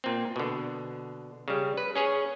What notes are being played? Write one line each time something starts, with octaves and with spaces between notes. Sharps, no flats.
A#2 C4
B2 D3
C#3 G3
B4
C#4 G#4 C#5